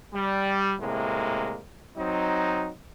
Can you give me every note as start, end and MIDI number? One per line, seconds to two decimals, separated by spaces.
0.14 0.74 55
0.80 1.58 45
0.80 1.58 48
0.80 1.58 56
0.80 1.58 58
1.97 2.70 54
1.97 2.70 60
1.97 2.70 63